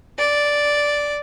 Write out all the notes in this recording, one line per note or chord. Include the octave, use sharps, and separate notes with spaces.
D5